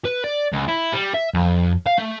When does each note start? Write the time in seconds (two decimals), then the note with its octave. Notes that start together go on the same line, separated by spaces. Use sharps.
0.05 B4
0.24 D5
0.52 C#2
0.68 E4
0.93 G3
1.14 E5
1.34 F2
1.86 F5
1.98 A3